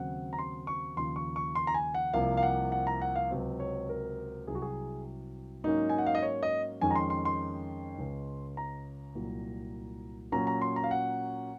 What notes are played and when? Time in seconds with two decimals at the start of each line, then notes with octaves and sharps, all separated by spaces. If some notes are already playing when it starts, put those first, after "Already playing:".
Already playing: D#2 C#3 F#3 C4 F#5
0.33 A#5
0.39 C6
0.67 C#6
0.97 D#2 C#3 F3 C6
1.16 C#6
1.36 C#6
1.55 C6
1.67 A#5
1.74 G#5
1.94 F#5
2.13 C2 C3 F3 A#3 F5
2.37 F5
2.43 F#5
2.72 F#5
2.87 A#5
3.02 F#5
3.16 F5
3.31 C#2 C3 F#3 C4
3.60 C#5
3.89 A#4
4.47 C2 C3 F#3 G#4
4.55 F#4
4.62 G#4
5.64 G#2 F#3 A#3 C#4 D#4
5.89 G#5
5.98 F#5
6.06 F5
6.15 D#5
6.22 C#5
6.43 D#5
6.81 F2 D#3 G#3 C#4 G#5
6.91 A#5
6.95 C6
7.10 C6
7.25 C6
7.98 C#2 C#3 G#3 C#4
8.57 A#5
9.15 C2 A#2 F#3
10.32 A#2 F#3 C#4 A#5
10.47 A#5
10.62 C6
10.76 A#5
10.84 F5
10.91 F#5